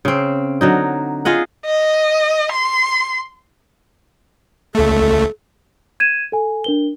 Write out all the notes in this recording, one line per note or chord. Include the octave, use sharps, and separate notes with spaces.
C#3 C4
D3 F#3 D#4
F4 G#4 D#5 F#5
D#5
C6
C#2 A3 A4
G#6 D#7 E7
A4 G#5
D4 A#4 G7